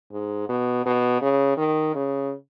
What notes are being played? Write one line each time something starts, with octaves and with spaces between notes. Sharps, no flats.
G#2
B2
B2
C#3
D#3
C#3